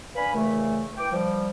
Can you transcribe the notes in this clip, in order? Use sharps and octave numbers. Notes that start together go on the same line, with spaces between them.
D4 B4 F5 G#5 B5
D#2 A#2 C#3 E3 A3
E3 G5 D6
F3 G3